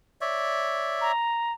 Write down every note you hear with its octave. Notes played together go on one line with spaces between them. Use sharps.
C#5 D5 E5
A#5